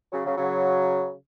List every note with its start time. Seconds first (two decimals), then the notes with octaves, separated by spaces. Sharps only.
0.12 C#3 F#3
0.25 C#3 F#3
0.37 C#3 F#3